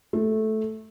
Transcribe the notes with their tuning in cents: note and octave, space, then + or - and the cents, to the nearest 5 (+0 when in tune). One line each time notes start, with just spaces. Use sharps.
A3 -10